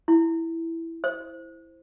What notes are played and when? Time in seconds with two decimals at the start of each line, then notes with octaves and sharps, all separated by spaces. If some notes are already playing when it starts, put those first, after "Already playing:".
0.08 E4
1.04 C5